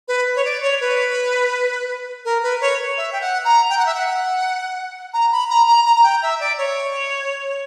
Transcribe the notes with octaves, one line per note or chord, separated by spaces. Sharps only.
B4
C#5
D5
C#5
B4
A#4
B4
C#5
E5
G5
F#5
A#5
G5
F#5
E5
F#5
A#5
B5
A#5
A#5
A#5
A#5
G5
E5
D5
C#5